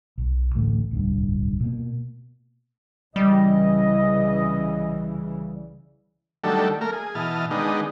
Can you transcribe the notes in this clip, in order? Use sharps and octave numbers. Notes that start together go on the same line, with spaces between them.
B1
A1 D2 A2 A3
D1 C2 G2
B2 A#3
C2 C#3 E3 G3 D#5
D#3 F#3 G3 A3 D4 A4
A3 A#3 A#4 F6
G#4
B2 E3 D#5 A5 F6
D#3 G#3 B3 D4 D#4